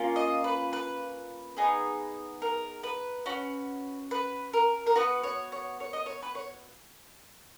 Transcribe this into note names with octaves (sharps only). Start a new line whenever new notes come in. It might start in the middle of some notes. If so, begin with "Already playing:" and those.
Already playing: A#3 C#4 F4
D#5
B4
B4
B3 D#4 G#4
A#4
B4
C#4 F#4
B4
A#4
A#4
B3 F#4 B4
C#5
C#5
C#5
D#5
C#5
B4
C#5